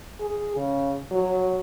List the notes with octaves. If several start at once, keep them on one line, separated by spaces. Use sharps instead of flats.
G#4
C#3
F#3